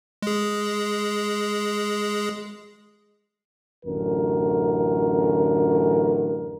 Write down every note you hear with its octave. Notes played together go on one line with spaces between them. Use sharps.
G#3 G#4
A1 F#2 D3 A#4